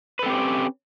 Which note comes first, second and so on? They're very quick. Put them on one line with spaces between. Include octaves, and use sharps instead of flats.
B4 A4 C4 G4 C#4